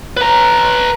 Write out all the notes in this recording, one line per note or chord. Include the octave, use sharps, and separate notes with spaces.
B4 A#5